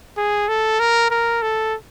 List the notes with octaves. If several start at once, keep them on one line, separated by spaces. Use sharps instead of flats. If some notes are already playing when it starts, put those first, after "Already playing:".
G#4
A4
A#4
A#4
A4